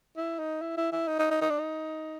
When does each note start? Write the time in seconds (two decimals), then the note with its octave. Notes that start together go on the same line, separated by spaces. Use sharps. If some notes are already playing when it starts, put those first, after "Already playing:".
0.17 E4
0.39 D#4
0.61 E4
0.77 E4
0.92 E4
1.08 D#4
1.19 D#4
1.30 D#4
1.41 D#4
1.50 D4
1.58 D#4